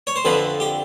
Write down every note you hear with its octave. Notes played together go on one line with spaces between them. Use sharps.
C#5
C5
F2 D3 F3 B4
G4